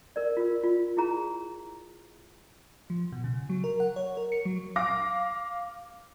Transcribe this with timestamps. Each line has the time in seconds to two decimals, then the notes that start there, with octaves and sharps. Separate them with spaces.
0.16 A#4 D5
0.37 F4 A#4
0.64 F4
0.97 E4 G#4 A#5
2.90 F3
3.12 B2
3.24 C#3
3.49 F#3
3.64 A#4
3.80 F#5
3.96 C#5
4.17 A#4
4.32 C#7
4.45 F#3
4.76 F5 D6 A#6